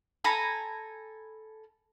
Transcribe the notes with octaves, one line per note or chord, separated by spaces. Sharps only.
A4 G#5 A#5 B5